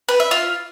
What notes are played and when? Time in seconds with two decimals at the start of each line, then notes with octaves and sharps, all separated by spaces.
0.09 B4
0.20 E5
0.31 F4